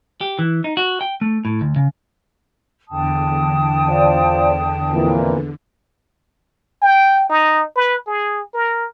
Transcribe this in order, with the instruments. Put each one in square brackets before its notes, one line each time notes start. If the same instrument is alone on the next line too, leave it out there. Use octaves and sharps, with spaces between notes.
[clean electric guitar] G4
E3
D#4
F#4
G5
A3
A2
D2
C#3
[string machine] E2 D3 [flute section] G5 A5 D#6
[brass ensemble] F4 C5 D5
F2 A#2 E3
[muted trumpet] G5
D#4
B4
G#4
A#4